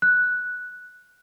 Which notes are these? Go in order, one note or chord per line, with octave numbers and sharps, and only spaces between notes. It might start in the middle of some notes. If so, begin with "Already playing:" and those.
F#6